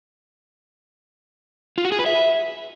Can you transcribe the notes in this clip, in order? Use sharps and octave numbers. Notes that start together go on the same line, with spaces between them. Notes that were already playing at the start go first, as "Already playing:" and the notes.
F4
F#4
G#4
B4
E5